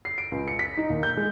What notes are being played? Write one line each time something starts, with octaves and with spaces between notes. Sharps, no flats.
C7
D7
C#2
C#7
B6
D#4
D#2
G6
G#3